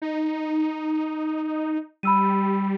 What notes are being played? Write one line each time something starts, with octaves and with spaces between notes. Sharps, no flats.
D#4
G3 B5 E6 D#7